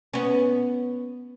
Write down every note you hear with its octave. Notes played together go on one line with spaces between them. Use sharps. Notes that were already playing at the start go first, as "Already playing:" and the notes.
B3 C#4